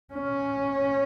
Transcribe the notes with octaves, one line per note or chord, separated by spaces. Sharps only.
C#4